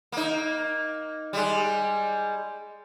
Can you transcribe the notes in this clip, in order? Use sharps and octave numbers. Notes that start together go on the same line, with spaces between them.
A#3 D#4
G3 G#3